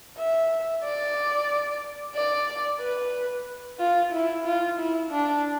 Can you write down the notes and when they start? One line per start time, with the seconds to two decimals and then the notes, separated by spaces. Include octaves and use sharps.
0.18 E5
0.84 D5
2.15 D5
2.80 B4
3.79 F4
4.12 E4
4.46 F4
4.79 E4
5.11 D4